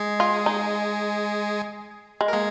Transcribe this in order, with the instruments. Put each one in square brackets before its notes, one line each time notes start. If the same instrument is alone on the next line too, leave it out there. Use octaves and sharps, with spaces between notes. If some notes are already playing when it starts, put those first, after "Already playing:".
Already playing: [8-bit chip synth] G#3 G#4
[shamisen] F4
D#4
G#3
[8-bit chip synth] A#4
[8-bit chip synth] G#3 G#4 [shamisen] A#3